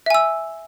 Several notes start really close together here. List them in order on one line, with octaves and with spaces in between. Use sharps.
E5 G#5 E6